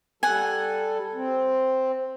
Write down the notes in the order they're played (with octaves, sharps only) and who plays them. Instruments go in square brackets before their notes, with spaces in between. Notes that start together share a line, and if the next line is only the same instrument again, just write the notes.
[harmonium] G3 A4 [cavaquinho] F#5 G#5
[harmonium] C4